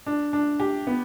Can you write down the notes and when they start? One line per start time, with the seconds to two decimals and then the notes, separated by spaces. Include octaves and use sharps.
0.06 D4
0.33 D4
0.60 G4
0.87 B3